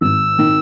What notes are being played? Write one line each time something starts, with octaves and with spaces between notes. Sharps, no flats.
G#1 E6
D#3